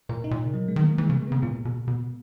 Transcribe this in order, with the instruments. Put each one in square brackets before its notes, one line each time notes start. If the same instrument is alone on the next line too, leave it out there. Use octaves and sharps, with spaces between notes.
[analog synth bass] A#2 [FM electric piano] A#4
[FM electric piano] D#4
[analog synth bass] A#2
C#3
[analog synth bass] B2 [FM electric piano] F#3
[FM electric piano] G#3
[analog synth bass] D#3
[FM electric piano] A#3
[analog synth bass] E3 [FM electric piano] G#3
[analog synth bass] C#3 [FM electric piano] A#3
[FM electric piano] G#3
[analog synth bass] C#3 [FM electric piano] B3
[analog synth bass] A#2 [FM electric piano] A#3
[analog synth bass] B2
B2